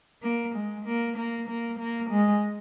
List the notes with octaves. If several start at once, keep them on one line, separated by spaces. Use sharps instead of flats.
A#3
G#3
A#3
A#3
A#3
A#3
G#3